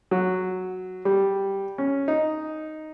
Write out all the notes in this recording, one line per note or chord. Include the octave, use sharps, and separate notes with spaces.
F#3
G3
C#4
D#4